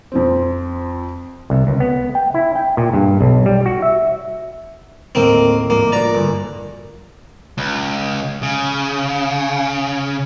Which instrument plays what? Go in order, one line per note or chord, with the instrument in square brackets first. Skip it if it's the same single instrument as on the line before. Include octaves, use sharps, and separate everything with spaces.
[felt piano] F2 F3 C4
[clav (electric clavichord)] C2
C#2
B3
G5
E4
G5
A#2
G2
B1
G3
F#4
E5
[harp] D#2 A2 D#3 [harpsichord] A#3 C4
[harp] G#2 F3 D4 [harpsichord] A#3
[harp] A#3 B3 F#4 [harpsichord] D5 A#5
[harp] G1
[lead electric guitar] C#2
C#3